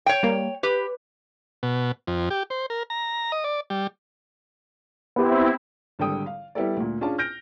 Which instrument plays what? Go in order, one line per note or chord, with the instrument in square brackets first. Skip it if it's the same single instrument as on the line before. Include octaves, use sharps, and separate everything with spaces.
[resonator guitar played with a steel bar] C#5 G5
[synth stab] G3 A#3
[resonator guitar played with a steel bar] G4 [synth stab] B4
[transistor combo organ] B2
F2
G4
C5
A#4
A#5
D#5
D5
G3
[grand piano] B3 G4 [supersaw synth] C4 E4
[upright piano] G#1 D3 G3 A4 G5 D#6
F5
G3 B3 E4 G4 A4 D5
D2 A#2
C#4 D4 F4 G#4 D5 A5
F6 G6 A#6 D7